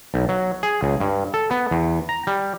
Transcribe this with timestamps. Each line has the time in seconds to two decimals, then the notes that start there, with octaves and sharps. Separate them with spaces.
0.14 B1
0.29 F#3
0.63 G#4
0.83 C#2
1.00 G2
1.34 A4
1.51 B3
1.71 E2
2.09 A#5
2.27 G3